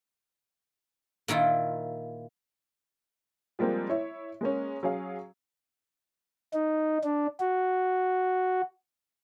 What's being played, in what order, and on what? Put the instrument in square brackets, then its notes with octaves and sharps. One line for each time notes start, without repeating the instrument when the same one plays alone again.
[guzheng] A#2 D#3 E4 F4
[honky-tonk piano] F3 G3 G#3 A#3 C4
E4 C#5 E5
G#3 A#3 C#4
F#3 C#4 G#4 F5
[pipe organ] D#4
D4
F#4